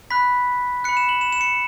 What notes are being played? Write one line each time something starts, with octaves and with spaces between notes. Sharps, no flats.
B5 F#6 B6
B5 F#6 C#7
E7
F#7
E7
E7
C#7